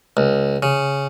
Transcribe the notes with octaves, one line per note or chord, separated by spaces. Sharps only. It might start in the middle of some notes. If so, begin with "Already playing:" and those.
C#2
C#3